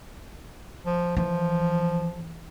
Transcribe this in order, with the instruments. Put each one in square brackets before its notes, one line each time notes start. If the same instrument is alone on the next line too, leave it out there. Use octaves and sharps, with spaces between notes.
[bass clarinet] F3
[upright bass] E3 [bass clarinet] F3